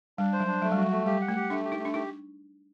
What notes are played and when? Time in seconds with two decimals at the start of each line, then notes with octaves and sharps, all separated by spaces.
0.18 G3 D4
0.33 C5
0.40 F#3
0.47 D4
0.62 F#3 A3
0.72 G3
0.77 F#4
0.82 F#3
0.91 A3
1.06 G3 G4
1.21 F#5
1.28 A3
1.36 G4
1.50 A3 D4
1.65 G4
1.72 D#4
1.79 A3
1.85 D4
1.94 D#4 G4